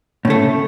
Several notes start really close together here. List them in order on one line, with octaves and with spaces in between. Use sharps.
A2 C#3 A3